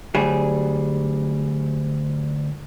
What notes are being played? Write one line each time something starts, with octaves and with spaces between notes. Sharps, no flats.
D2 F#3 G3 G#4